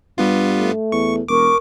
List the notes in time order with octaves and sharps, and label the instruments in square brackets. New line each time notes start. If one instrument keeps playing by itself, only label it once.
[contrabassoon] G2 [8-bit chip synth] G3 B3 F4
[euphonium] A3
[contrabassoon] E2 [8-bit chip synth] C#6
[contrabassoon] E1 [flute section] A#4 C#6 [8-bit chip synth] D6